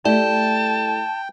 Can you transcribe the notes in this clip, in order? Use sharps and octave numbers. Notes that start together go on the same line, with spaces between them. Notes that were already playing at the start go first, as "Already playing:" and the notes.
A3 E4 G4 D5 G5 A5